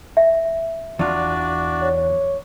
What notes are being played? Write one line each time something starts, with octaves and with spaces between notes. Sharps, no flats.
E5
E2 D4 F4 F#4 D5
C#5